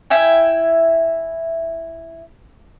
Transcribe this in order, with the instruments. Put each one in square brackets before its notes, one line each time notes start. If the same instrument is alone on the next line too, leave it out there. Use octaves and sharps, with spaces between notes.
[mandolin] E4 E5 G5 G#5